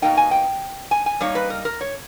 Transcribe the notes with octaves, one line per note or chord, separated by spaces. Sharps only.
B2 G3 A#3 D#4 G5
G#5
G5
G#5
G#5
G3 A#3 D#4 C#5
B4
A#4
A#4
C#5